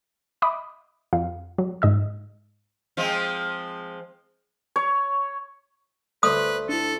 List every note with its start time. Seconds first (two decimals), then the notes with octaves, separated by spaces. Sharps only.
0.42 D#5 E5 B5 D6 D#6
1.13 F2 F5
1.58 F#3
1.82 G#2 D#5 E6
2.97 F3 G#3 C4
4.76 C#5
6.23 D2 A3 B4 C5 D#6
6.69 D4 E4 A4